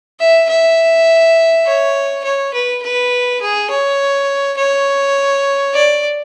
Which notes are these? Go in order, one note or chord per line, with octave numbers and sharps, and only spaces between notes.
E5
E5
C#5
C#5
B4
B4
G#4
C#5
C#5
D5